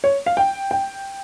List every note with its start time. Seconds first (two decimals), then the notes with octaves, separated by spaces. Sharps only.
0.04 C#5
0.26 F5
0.37 G5
0.71 G5